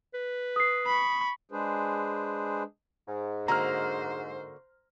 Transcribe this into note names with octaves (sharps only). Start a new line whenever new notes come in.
B4
D#6 C7
B5 C#6
G#3 D4 G#4 B4 C5
G#2
D3 A#3 F#4 C5 A#5 F6